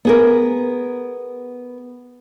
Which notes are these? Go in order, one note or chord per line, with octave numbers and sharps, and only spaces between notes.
B3 G#4 A#4